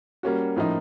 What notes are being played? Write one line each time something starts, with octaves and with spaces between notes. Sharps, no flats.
G3 A#3 C#4 F#4
A2 F3 A#3 D#4